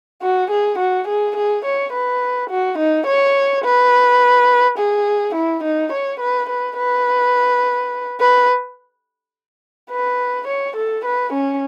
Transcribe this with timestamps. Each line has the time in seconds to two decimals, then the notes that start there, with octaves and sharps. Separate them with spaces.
0.22 F#4
0.51 G#4
0.79 F#4
1.07 G#4
1.36 G#4
1.65 C#5
1.93 B4
2.50 F#4
2.78 D#4
3.07 C#5
3.64 B4
4.78 G#4
5.35 E4
5.63 D#4
5.92 C#5
6.20 B4
6.49 B4
6.77 B4
8.20 B4
9.91 B4
10.47 C#5
10.76 A4
11.05 B4
11.33 C#4